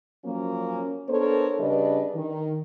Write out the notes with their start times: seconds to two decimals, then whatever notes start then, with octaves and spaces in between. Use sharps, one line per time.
0.24 F3 F#3 A#3 C#4
1.08 B3 D4 A4 A#4 C5 C#5
1.59 C#3 G3 D4 B4 D5 D#5
2.15 D#3